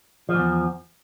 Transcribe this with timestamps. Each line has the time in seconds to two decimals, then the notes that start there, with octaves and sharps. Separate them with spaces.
0.29 F3
0.34 G#2
0.39 E2